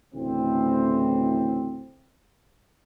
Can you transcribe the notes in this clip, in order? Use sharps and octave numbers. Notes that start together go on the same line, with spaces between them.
D2 A2 C#3 E3 C4